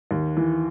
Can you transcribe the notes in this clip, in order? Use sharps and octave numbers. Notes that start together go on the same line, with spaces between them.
D#2
E3